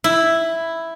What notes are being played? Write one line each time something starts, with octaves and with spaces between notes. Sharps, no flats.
E4